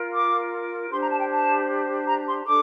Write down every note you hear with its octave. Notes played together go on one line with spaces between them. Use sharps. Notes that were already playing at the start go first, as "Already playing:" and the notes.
Already playing: F4 A#4
D6
D4 G4 C5 C6
A#5
A5
G5
A5
A#5
C6
D4 A4 D6